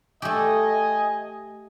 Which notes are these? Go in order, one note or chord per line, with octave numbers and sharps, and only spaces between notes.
A3 G4 D#5 G#5